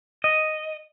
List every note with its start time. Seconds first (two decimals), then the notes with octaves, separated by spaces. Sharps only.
0.24 D#5